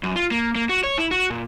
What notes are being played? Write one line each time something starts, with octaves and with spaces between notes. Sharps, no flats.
F#2
F4
A#3
A#3
F#4
C#5
E4
F#4
A#2